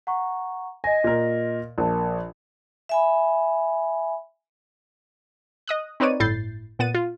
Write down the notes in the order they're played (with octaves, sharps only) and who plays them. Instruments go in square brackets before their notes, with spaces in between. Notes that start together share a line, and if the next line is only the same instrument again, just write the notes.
[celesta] F#5 A#5 C#6
[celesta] D#5 A#6 [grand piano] G#5
[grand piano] A#2 A#4
[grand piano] A#1 [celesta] A#4 A5
[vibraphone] E5 G#5 B5
[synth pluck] D#5 D#6 F#6
C4 D#4 B4 C#5 D5 D#7
G1 A2 E4 G6 A6 C7
A#2 B3 F#5 A6 D#7
F4